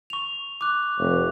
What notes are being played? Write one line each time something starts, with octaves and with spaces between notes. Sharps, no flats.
C#6 F7
D6 F#6
F1